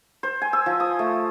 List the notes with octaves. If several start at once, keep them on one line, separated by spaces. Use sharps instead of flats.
C5
G#5
E6
F3
D#6
A3